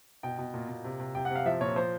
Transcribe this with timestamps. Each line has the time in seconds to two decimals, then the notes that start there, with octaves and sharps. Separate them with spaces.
0.23 B2 G5
0.39 B2
0.54 A#2
0.69 A#2
0.84 C3
1.00 C3
1.15 C3 G5
1.25 F#5
1.30 C3
1.35 F5
1.46 F3 E5
1.61 A#2 C#5
1.76 F3 C5